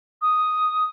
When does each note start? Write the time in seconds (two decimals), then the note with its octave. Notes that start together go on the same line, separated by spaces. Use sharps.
0.22 D#6